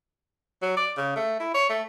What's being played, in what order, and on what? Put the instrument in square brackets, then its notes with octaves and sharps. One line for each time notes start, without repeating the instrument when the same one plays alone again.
[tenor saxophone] F#3
D5
C#3
A3
E4
C#5
A3